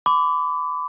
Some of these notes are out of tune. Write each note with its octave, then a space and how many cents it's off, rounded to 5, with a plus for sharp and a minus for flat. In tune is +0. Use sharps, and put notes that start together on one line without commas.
B5 +30 D6 -20